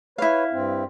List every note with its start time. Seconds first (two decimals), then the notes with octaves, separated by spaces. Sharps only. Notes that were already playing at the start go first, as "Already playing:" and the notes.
0.18 E4 B4 C#5 F5
0.52 G2 C4